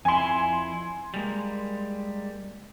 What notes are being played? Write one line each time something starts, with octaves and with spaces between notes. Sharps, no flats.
F2 E4 G#5 C6
G3 G#3 A#3